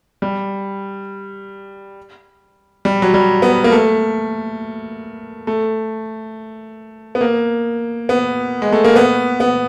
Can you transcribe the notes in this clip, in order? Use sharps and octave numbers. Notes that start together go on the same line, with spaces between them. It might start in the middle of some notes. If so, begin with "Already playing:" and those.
G3
G3
F#3
G3
B3
A#3
A3
A3
B3
A#3
B3
G#3
A3
A#3
B3
B3